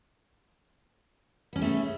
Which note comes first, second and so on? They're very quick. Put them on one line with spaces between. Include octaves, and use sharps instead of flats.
B3 C#4 G4 A3 G#4